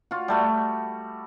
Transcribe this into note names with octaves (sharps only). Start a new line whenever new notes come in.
F4 F#4
G3 A3 F#4